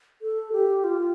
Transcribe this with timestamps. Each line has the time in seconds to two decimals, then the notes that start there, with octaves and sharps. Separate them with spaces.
0.22 A4
0.52 G4
0.84 F4